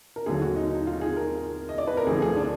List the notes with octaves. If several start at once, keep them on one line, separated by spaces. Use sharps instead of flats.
A#4
D#2 D3 F#3 G#4
F#4
D#4
D#4
F4
G#4
A#4
D#5
D5
B4
A#4
D2 D3 F3 G#4
G#4
D4